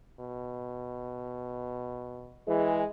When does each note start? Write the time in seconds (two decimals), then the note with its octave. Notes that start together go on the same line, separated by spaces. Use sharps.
0.20 B2
2.48 E3 G#3 G#4